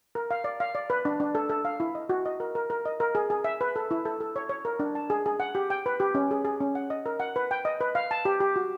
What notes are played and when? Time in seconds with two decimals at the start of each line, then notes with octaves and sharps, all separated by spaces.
0.15 A#4
0.31 F5
0.44 D5
0.60 F5
0.75 D5
0.90 B4
1.05 D4
1.20 D4
1.35 A4
1.49 A4
1.65 F5
1.80 E4
1.95 D#5
2.09 F#4
2.26 D#5
2.40 A#4
2.55 A#4
2.70 A#4
2.86 D#5
3.00 A#4
3.15 G#4
3.30 G#4
3.44 E5
3.61 B4
3.76 A4
3.91 E4
4.05 A4
4.21 A4
4.36 C#5
4.50 C#5
4.65 A#4
4.80 D4
4.95 A5
5.10 G#4
5.26 G#4
5.40 F#5
5.55 G4
5.70 G5
5.86 B4
6.00 G4
6.15 C#4
6.31 G#4
6.45 G#4
6.61 C#4
6.75 F#5
6.90 D#5
7.06 A#4
7.20 F#5
7.36 B4
7.51 G5
7.65 D#5
7.81 B4
7.95 F5
8.11 A5
8.25 G4
8.40 G4
8.56 F#4